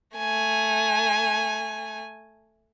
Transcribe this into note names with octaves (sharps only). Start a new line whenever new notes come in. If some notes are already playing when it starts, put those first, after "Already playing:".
A3 G#5